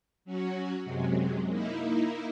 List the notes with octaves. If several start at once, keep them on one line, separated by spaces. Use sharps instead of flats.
F#3 C#4 F#4
F#2 C3 F#3 G#3
A#3 D#4 E4